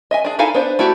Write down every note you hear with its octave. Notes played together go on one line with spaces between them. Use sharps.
D#5 E5 G#5
D4 G#4
D#4 E4 A4 F5 G#5
B3 D4 C5
A3 E4 F#4 G4